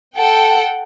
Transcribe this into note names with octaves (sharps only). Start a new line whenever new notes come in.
A4 F#5 G5